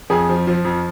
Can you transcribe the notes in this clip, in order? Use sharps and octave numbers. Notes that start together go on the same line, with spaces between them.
F2 G#4
F3
F3
F2